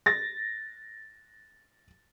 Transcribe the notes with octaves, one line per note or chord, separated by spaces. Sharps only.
A6 A#6